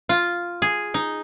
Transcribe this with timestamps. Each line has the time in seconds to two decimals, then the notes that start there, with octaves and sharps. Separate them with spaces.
0.09 F4
0.62 G#4
0.94 D#4